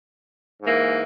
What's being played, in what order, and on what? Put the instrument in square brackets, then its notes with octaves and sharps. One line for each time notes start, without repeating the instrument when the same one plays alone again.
[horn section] G#2 E3 A#3